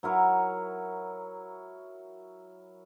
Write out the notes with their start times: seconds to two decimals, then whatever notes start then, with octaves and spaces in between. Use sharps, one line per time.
0.03 F#3 E4 A#4 C#5